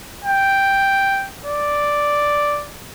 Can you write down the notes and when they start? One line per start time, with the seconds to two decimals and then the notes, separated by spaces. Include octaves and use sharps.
0.25 G5
1.46 D5